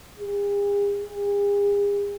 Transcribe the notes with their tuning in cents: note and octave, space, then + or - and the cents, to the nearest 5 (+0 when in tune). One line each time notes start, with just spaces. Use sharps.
G#4 -45
G#4 -45